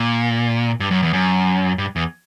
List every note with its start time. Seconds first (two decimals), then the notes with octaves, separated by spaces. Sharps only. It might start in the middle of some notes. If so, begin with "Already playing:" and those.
Already playing: A#2
0.80 G2
0.91 F#2
1.02 E2
1.13 F#2
1.78 G2
1.96 E2